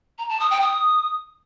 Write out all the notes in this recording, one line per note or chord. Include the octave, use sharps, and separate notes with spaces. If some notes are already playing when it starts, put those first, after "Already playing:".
A#5
A5
D#6
G5
D#6